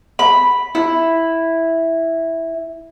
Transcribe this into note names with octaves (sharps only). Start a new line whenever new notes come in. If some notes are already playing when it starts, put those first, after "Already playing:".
B5
E4